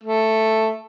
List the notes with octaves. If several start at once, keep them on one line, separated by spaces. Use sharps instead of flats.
A3